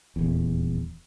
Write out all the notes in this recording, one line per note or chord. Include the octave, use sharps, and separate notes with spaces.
D#1 E2